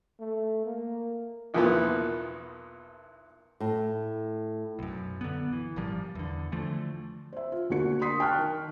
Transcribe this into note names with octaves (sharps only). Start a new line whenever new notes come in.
A3
A#3
B1 E2 A#2 F3 A#3 B3
A2
B1 F#2
D3 B3
E3
G#1 A#2 F3 G3
E2 D3
D3 E3 F3 A3
C5 E5
F4
D2 A#3 D4 F#4 C#7
C6 D#6 B6 C7
G5 A5 C#6 F6 F#6
D#3